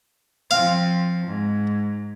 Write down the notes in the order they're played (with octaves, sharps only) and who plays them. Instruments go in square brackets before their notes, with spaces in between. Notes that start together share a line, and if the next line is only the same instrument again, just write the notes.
[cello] F3 C4 [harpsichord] F5
[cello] G#2